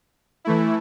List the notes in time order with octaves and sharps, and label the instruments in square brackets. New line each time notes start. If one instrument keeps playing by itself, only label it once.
[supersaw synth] E3 A3 E4